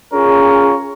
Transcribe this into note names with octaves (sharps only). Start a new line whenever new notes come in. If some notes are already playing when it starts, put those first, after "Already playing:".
C#4 F4 G#4 A#4 C#5